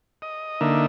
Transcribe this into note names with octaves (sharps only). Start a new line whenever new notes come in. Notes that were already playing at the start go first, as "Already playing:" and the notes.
D#5
D3 A#3 D#4 E5